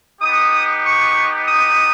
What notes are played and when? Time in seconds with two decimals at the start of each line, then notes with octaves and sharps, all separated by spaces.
0.21 B3 D#4 G4 D#6
0.84 C#6
1.46 D#6